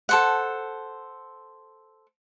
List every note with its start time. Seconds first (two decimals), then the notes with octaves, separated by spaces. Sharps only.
0.09 A4 C5 F#5